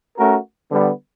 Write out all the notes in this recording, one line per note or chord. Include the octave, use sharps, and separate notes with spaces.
A3 C#4 F#4 A#4
D3 G3 B3